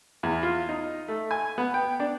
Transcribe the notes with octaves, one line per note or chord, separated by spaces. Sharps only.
E2
F4
D#4
A3
G#5
B3
G5
D4